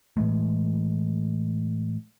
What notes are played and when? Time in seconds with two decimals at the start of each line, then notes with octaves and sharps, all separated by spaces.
0.17 A2 E3 G#3 A3